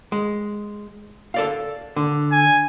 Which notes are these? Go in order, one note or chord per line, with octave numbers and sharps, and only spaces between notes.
G#3
A4 D5 F5
D3
G#5